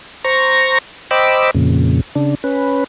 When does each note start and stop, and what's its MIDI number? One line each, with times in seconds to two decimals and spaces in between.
0.24 0.78 72
0.24 0.78 82
0.24 0.78 85
0.24 0.78 94
1.11 1.51 72
1.11 1.51 75
1.11 1.51 79
1.11 1.51 83
1.11 1.51 86
1.11 1.51 88
1.55 2.01 41
1.55 2.01 46
1.55 2.01 49
2.15 2.35 49
2.15 2.35 62
2.44 2.84 61
2.44 2.84 71